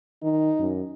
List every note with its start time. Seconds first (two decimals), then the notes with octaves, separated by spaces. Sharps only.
0.23 D#3 D#4
0.60 F#2